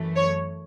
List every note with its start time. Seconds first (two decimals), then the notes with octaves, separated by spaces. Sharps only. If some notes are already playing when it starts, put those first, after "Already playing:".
Already playing: F#2 E3 A3
0.16 C#5